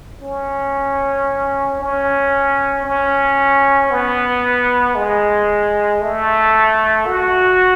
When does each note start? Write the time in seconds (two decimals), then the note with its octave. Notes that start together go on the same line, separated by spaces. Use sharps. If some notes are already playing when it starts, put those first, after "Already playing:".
0.22 C#4
1.80 C#4
2.85 C#4
3.91 B3
4.95 G#3
6.01 A3
7.06 F#4